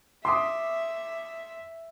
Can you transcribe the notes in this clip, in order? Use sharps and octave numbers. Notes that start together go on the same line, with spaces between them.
E5 C6 D6 D#6